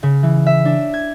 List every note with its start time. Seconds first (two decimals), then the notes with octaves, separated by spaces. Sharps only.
0.03 C#3
0.23 E3
0.46 E5
0.65 D4
0.94 G#6